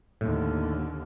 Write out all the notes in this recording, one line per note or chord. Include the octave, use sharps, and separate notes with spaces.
D#2 A2 D3